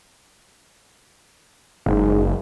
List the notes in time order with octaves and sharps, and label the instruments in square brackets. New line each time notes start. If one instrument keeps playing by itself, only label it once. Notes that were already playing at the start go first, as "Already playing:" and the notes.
[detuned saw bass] F#1 [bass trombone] G#2